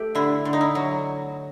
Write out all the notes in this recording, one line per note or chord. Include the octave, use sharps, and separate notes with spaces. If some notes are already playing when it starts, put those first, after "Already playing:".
Already playing: A3 G4 A4
D3 E4
D3
D#4
E4
F#3